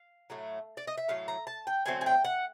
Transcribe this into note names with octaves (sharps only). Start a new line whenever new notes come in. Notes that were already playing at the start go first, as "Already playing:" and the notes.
Already playing: F5
A2 F#3 A3
D5
D#5
E5
A2 F#3 A3 F5
A#5
A5
G5
D3 F#3 A3 C4 G#5
G#5
G5
F#5